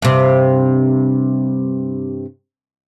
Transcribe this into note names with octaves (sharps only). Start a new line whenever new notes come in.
G2 C3